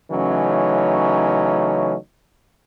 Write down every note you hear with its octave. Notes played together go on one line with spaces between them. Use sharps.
C#3 E3 F#3 A3 C#4 D#4